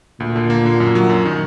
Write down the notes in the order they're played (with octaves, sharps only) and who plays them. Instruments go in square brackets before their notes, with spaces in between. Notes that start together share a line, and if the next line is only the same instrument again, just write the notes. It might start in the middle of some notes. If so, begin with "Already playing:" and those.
[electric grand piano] D2 [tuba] A#2
[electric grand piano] D3
A#3
D3
F#2
F#3
F#2
D#3